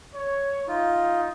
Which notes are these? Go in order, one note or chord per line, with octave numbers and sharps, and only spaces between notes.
C#5
D#4 F4